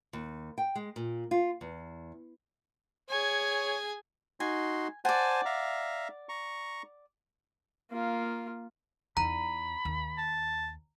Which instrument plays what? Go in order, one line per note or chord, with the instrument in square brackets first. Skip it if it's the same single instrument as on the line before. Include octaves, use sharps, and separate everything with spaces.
[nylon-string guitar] D#2
G5
G#3
A#2
F4
E2
[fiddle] G#4 G#5 [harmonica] C#5
[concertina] D#4 F#4 C6 [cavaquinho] G#5
[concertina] C5 G#5 A5 [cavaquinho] D5 F#5
[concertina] E5 F5 A#5
A#5 C#6
[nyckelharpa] A#3 F4
[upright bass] E2 D#4 [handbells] A#5 [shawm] B5
[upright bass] D#2
[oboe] A5